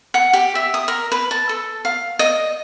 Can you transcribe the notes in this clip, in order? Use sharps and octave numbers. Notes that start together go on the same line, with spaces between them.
F#5
G4
E5
D#6
A#4
B4
A5
A4
F5
D#5